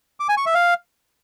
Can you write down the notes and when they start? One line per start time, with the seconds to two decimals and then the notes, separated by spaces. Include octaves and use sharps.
0.20 D6
0.29 G#5
0.37 C#6
0.46 E5
0.55 F5